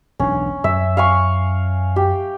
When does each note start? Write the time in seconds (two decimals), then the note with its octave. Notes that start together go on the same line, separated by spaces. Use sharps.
0.19 E1 B1 C#4 D4
0.64 F#2 E5
0.97 F5 G#5 C#6
1.96 G4